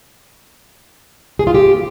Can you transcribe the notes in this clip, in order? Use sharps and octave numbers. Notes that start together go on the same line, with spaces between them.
G#4
F4
G4